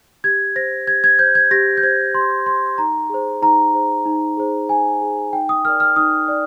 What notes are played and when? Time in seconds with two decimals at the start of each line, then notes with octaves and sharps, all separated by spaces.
0.24 G4 G#6
0.56 C5 A#6
0.87 G4 G#6
1.04 G#6
1.19 C5 G6
1.35 G#6
1.51 G4 A#6
1.78 G6
1.83 C5 G#6
2.15 G4 C6
2.46 C5 C6
2.78 D#4 A#5
3.10 G#4 C5
3.42 D#4 A#5
3.74 G#4 C5
4.06 D#4
4.37 G#4 C5
4.69 D#4 G#5
5.01 G#4 C5
5.33 D#4 G5
5.49 D#6
5.65 A#4 D5 F6
5.80 F6
5.96 D#4 D#6
6.28 D5